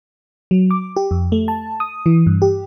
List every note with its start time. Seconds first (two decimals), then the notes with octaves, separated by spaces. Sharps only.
0.51 F#3
0.71 D6
0.96 G4
1.11 F2
1.32 A3
1.48 A5
1.80 D#6
2.06 E3
2.27 G2
2.42 G4